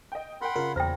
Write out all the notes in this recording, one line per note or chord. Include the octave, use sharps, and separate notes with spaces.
D#5 G5
A#4 F#5 G5 B5 C6
C#3 F4 A#4
E2 A#2 C5 G5 A#5 A#6